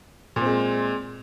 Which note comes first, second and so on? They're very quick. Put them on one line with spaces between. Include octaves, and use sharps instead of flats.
A#2 C4 G#3